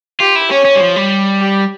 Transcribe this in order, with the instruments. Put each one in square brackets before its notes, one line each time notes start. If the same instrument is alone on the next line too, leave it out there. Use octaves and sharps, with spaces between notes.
[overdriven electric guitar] F4 [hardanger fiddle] G4
[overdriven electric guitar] E4
[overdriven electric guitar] C#4 [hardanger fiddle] C#5
[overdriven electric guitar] C#4
G3
F3
G3
[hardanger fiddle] G4